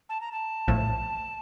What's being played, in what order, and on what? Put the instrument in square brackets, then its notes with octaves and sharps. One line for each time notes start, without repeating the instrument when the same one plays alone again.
[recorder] A5
A#5
A5
[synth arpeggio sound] A#1 A2 F3 A3